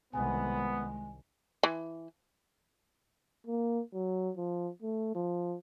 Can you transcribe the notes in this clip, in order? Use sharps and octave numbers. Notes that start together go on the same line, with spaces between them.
C2 D#3 G#3 B3 G#5
E3
A#3
F#3
F3
A3
F3